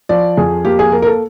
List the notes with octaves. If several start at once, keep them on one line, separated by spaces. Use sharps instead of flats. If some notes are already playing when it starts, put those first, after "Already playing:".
F3 D5
F2 G#4
A#3 G4
G#4
A#3 A#4
A#4
A4